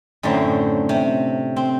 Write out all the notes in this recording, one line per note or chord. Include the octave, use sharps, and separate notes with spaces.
F#2 A2 D3 F#3 C4
C3
C4